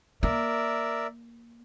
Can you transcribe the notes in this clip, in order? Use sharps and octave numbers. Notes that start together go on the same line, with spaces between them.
A#3 A#4 D5 E5